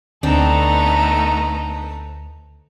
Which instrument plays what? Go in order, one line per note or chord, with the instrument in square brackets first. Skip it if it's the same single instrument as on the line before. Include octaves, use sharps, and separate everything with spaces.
[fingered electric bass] D2 [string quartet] A3 B3 D#4 [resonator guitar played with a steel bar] C4 D4 [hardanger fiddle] A4 A#5